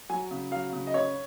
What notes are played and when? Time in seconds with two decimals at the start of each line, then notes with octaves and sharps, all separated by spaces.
0.10 F#3 G#5
0.31 C#3
0.51 F#3 F5
0.73 C#3
0.87 D#5
0.94 C#3 C#5